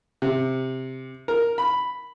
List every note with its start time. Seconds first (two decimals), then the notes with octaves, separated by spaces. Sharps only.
0.22 C3
1.28 A#4
1.58 B5